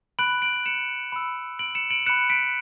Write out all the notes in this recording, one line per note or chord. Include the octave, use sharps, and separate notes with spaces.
B5 F#6 D7 F#7
D7 F#7
C#7 E7
B5 E6
D7 F#7
C#7 E7
D7 F#7
B5 F#6 C#7 E7
B6 D7